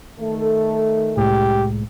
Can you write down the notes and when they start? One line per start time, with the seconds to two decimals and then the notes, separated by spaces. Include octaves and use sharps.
0.20 D#3 A3 A4
1.17 C2 A2 G#3 G4